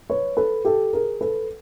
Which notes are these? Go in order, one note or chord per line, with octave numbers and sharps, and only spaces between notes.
B4 C#5
A4 B4
G4 A4
G#4 A#4
A4 B4